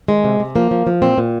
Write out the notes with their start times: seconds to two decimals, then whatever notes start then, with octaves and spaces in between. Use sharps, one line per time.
0.08 D#3 G#3
0.24 C3
0.40 C3
0.56 F3 A#3
0.71 F3
0.87 F3
1.02 A#2 C4
1.18 A#2